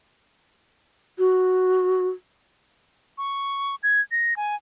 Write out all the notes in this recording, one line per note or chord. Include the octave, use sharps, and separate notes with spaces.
F#4
C#6
G#6
A#6
G#5